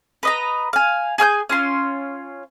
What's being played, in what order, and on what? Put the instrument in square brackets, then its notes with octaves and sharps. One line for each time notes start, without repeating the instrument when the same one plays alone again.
[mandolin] B4 D#5 A#5
F5 G#5
G#4 G#5 F6 G6
C#4 F4 C6